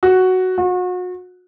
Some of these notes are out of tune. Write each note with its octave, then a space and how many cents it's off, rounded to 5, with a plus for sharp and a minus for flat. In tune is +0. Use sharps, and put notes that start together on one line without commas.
F#4 +5
F#4 -35